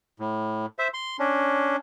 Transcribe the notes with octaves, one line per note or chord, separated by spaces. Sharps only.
A2
C5 E5
C6
C#4 D4